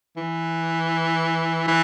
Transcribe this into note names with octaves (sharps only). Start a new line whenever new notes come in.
E3
E3